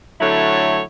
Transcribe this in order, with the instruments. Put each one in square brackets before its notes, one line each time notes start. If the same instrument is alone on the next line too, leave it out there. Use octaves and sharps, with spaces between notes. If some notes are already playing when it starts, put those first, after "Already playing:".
[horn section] D3 F#3 A3 E4 C#5 A5